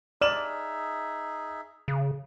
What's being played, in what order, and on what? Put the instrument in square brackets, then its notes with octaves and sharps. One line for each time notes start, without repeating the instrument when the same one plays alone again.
[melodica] D#4 G#4 E5 [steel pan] D5 [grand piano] F6 E7 F#7
[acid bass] C#3